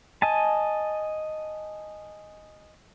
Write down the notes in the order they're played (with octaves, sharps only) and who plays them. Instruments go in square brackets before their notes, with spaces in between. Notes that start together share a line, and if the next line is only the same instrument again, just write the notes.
[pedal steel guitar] D#5 G#5 A5